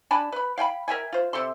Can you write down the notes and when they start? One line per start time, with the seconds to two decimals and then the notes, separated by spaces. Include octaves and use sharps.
0.11 D4 G#5 A5 B5
0.32 B4 B5
0.58 F5 G5 G#5 B5
0.88 A#4 E5 G5 G#5
1.12 F4 C5
1.33 C3 A4 C6